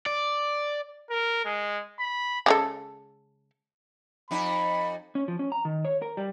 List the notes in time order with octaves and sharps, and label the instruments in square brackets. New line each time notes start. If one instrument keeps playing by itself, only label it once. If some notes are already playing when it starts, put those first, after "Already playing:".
[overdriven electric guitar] D5
[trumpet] A#4
G#3
B5
[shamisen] C#3 G#3 A4
[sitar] F2 D#4 [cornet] B5
[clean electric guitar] C#4
F3
C#4
A#5
D#3
C#5
A#4
G3